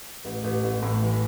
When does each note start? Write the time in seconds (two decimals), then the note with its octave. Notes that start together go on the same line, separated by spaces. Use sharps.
0.25 A1
0.44 A1
0.64 A1
0.83 A2
1.03 E3